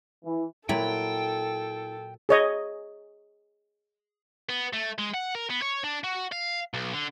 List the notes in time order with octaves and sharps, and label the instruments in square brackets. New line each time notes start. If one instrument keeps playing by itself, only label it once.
[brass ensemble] E3
[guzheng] A#2 F#3 B5 [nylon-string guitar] E4 A#4 [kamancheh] A4 [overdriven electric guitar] G5
[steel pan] G#4 C#5 D#5
[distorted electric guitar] B3
A3
G#3
F#5
A#4
B3
C#5
D4
F#4
F5
B1
D3